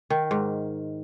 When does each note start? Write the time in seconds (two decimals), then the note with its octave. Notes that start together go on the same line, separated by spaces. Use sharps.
0.10 D#3
0.31 G#2